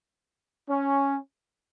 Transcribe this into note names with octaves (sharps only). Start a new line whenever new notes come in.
C#4